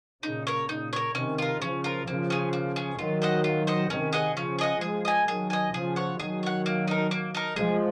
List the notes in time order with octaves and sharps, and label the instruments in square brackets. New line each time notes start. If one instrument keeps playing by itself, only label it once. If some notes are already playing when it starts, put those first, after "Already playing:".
[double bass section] A#2 C#3 [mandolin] D#4
[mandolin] A#4 C#5
[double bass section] A#2 C#3 [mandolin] D#4
[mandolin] A#4 C#5
[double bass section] C3 D#3 [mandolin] C#4
[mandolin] F4 A#4
[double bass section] C#3 F3 [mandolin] C#4
[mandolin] F4 A#4
[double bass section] C#3 F3 [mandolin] A#3
[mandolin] C#4 G#4
A#3
C#4 G#4
[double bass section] D#3 F#3 [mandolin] F4
[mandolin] C5 D#5 F#5
F4
C5 D#5 F#5
[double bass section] C3 D#3 [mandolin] C#4
[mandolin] G#4 D#5 F#5
[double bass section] C#3 F3 [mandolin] C#4
[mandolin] G#4 D#5 F#5
[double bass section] F3 G#3 [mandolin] G#4
[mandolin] D#5 G#5
[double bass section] D#3 F#3 [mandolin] G#4
[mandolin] D#5 G#5
[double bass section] C#3 F3 [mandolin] G#4
[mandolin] C#5 F#5
[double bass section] D#3 F#3 [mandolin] G#4
[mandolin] C#5 F#5
A#3
D#4 A#4
A#3
D#4 A#4
[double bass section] F3 G#3 [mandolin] G#4